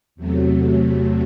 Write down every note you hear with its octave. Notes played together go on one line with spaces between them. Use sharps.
E2 C3 F#3 A3